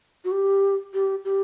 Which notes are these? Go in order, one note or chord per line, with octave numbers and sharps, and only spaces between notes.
F#4
G4
G4
G4